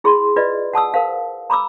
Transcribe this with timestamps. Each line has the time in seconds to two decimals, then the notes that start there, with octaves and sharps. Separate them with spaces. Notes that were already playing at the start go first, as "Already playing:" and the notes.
0.04 E4 G#4 B5 C6
0.36 F4 B4 D5 D#5
0.73 F#5 A5 D#6 E6
0.94 A#4 C5 F5
1.50 A#5 B5 D6 E6